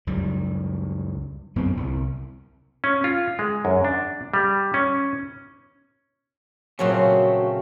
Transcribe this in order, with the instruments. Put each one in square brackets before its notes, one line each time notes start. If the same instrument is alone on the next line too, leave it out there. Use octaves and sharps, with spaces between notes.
[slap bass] C#2 F#2 G3
F#2 B3 C4
C2
[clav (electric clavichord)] C#4
F4
G#3
F#2
D4
G3
C#4
[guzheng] A#2 F#3 C#4 [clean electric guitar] C#3 A3 C4 [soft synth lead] F#4